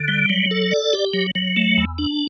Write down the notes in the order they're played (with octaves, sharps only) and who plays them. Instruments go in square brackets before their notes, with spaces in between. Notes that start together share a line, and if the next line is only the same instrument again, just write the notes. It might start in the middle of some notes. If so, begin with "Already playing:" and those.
Already playing: [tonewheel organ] D3
G3
F#3
A4
D5
G4
F#3
F#3
A3
E2
D4